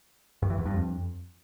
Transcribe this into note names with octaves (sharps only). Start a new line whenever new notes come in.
G2
E3
E2
G2
F2